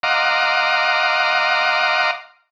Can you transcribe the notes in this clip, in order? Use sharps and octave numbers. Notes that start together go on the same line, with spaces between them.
D#5 F5 F#5 A#5 C6 D6